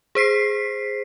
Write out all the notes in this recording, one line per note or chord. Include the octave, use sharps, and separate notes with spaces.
G#4 C5 B6 C7